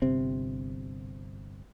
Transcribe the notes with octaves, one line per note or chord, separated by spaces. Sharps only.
G1 C3 C4